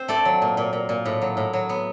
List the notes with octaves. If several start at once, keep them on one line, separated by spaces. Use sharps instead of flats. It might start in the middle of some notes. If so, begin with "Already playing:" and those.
Already playing: C4 C5
A3 D5
F#3
A#2
A#2
A#2
A#2
A2
F#3
A2
F#3
B3